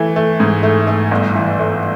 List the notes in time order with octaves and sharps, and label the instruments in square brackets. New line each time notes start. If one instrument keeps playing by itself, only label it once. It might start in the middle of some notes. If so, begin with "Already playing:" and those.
Already playing: [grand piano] E3 A3
A3
G#2
A3
A3
G1
E3
A3